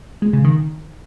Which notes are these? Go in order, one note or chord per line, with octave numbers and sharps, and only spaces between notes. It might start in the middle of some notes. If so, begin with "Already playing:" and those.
G#3
C#3
D#3